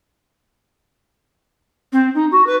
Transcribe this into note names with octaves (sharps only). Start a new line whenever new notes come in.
C4
D#4
F#4
B4